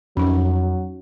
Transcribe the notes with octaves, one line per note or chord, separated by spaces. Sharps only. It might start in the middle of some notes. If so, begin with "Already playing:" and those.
F2 F#3 C#4 D#4